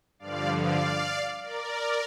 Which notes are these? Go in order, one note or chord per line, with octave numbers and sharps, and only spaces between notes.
G2 D3 F3 D5 F5
D5 F5
A#4 D5